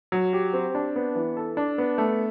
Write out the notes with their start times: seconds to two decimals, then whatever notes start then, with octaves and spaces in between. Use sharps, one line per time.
0.12 F#3
0.33 G4
0.53 C4
0.75 D4
0.96 B3
1.15 E3
1.37 A4
1.57 D4
1.78 B3
1.98 A3